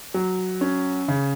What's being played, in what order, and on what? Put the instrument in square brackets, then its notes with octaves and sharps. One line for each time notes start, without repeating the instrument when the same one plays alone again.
[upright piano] F#3
C#4
C#3